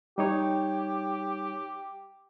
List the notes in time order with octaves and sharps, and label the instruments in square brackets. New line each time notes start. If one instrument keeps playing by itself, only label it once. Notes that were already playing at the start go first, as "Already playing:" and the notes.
[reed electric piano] G3 D#4 C#5 [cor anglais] G4